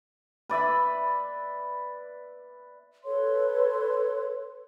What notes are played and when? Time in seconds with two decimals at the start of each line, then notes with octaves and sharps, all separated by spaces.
0.49 B4 D5 E5 B5
3.05 A4 B4 C#5 C6